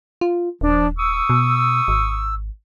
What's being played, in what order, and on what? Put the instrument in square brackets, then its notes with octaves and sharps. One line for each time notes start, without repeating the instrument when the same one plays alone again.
[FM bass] F4
[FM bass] D#1 [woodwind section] F3 D4
[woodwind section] C#6 D#6 E6
[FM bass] B2
G#1